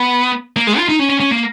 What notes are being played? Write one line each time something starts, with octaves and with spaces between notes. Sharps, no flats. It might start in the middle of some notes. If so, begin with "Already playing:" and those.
Already playing: B3
A#3
G#3
F4
D#4
C#4
C#4
C#4
A#3